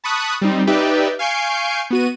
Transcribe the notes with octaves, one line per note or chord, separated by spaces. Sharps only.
A5 B5 C#6 D#6 F#6
G3 C4 D#4
D#4 G4 B4 D5 E5 G5
F5 G#5 C#6 G6 C7 D7
B3 F#4 D#7